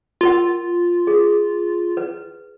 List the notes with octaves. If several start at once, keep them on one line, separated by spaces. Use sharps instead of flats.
F4 F#4 A#4 F#5
G#4
B4